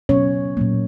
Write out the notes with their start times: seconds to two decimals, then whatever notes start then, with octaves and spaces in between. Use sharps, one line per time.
0.09 B2 F#3 B3 C#4 C#5
0.57 A#2 F#3 A#3